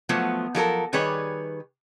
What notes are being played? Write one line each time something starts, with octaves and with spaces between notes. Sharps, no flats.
F3 F#3 A3 B3
F3 F#3 A4 A#4
D#3 G3 G#4 B4 C#5